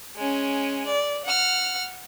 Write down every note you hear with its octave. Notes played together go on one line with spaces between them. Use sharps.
G#3 C#4
D5
F#5 F6